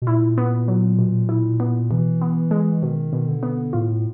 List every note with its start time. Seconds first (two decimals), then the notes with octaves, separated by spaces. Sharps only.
0.02 B2
0.07 A#2 E4
0.37 B3
0.68 F#3
0.99 B2
1.29 E4
1.60 B3
1.91 B2 E3
2.22 B3
2.51 G#3
2.82 B2 D#3
3.13 B2
3.27 D3
3.43 B3
3.73 A2 F4